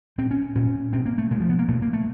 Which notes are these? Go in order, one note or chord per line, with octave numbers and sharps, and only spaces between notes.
A#2 C4
C#4
A#2 C#4
B2 C4
A#3
A3
B2 G#3
F3
B3
A#3
B2 A3
A#3
A3